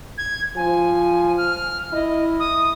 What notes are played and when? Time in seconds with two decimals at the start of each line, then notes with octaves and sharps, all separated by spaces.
0.18 G#6
0.56 F3 G#5
1.38 F6
1.93 E4 D#5
2.40 D#6